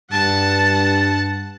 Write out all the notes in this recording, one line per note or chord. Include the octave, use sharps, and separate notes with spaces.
G2 F#5 A5